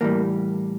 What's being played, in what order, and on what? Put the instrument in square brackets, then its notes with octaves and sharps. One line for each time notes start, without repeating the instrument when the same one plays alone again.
[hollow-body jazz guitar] A2 E3 G3 A#3